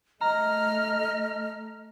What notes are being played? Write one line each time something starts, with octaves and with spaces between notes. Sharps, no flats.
A3 D#5 A#5 F6